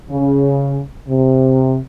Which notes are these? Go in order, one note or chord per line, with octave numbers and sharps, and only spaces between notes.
C#3
C3